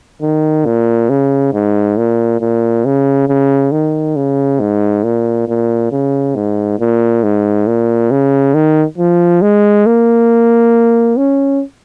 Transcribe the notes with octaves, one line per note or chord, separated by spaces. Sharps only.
D#3
A#2
C#3
G#2
A#2
A#2
C#3
C#3
D#3
C#3
G#2
A#2
A#2
C#3
G#2
A#2
G#2
A#2
C#3
D#3
F3
G#3
A#3
C#4